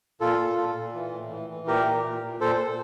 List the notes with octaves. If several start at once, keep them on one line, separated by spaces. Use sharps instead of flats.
A#2 F4 A4
A#2
A#2
A#2
E3
A2
E3
E3
A#2 G4 A#4
A#2
A#2
A#2
A#2 A4 C5
A#2